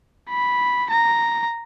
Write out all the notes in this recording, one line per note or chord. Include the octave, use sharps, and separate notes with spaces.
B5
A#5